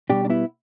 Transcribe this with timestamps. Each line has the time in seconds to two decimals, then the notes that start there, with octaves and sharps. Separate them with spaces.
0.10 B2 G3 D4 G4
0.25 D4
0.30 B3 E4